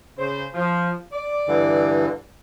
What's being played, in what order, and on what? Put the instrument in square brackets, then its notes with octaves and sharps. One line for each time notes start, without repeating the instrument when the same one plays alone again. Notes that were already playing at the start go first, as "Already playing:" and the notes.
[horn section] C#3 C5
F3
D5
[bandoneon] G2 D3 E3